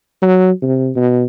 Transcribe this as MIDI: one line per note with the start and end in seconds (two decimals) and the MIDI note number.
0.22 0.51 54
0.62 0.91 48
0.96 1.24 47